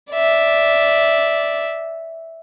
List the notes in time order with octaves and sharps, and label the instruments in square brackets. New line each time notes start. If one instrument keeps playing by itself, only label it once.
[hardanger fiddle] D5 E5